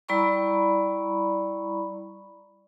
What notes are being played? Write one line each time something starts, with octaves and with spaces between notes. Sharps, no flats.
G3 E4 D5 A#5 B5 C#6